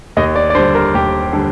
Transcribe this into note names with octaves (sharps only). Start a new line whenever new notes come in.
D#2 D#5
D5
D5
D3 G3 C5
A#4
D#2 G4
D3 G3